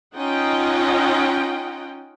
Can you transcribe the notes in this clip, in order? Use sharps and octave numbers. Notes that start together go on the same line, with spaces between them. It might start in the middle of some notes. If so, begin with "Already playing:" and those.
C#4 D#4 F4 D#5 F#5 G5